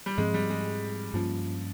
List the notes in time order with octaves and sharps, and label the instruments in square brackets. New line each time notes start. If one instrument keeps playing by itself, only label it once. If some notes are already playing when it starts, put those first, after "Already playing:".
[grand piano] G3
[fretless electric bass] G#2 F3 C4 [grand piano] G#3
[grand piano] G3
G#3
[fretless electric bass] G2 G3 A#3 C#4 [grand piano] F3